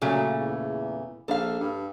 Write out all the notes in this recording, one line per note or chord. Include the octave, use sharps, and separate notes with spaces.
A#2 C#3 F#3 A3
E2
A#1 A4 F5
G2